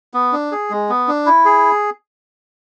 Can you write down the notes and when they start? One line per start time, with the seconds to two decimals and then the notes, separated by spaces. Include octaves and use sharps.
0.14 B3
0.33 D4
0.52 G#4
0.70 G#3
0.89 B3
1.08 D4
1.26 E4
1.45 G#4